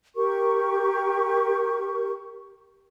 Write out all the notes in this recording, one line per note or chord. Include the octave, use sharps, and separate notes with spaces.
G4 A#4 C#6